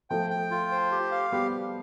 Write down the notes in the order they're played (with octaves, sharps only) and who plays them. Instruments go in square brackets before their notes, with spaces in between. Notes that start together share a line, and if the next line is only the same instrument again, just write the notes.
[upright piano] F3 A3 [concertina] G5
[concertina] G5
F4
C5
G4
F5
[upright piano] G3 B3 [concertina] G4